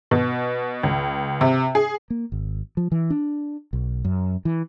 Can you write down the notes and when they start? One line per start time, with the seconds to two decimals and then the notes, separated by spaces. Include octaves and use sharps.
0.11 B2
0.83 C#2
1.41 C3
1.75 G#4
2.10 A#3
2.32 G#1
2.77 F3
2.92 E3
3.10 D4
3.73 B1
4.04 F#2
4.45 E3